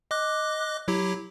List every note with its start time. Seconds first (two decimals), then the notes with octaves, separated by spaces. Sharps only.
0.11 D#5 D6 F#6
0.88 F#3 E4 G4